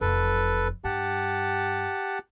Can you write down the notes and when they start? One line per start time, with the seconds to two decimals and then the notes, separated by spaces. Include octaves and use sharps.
0.01 F1 E2 A4 B4
0.84 G2 G4 F#5 A5